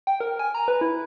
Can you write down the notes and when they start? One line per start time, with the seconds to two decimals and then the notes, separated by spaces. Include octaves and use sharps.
0.07 G5
0.20 A#4
0.39 G#5
0.55 A#5
0.68 B4
0.81 E4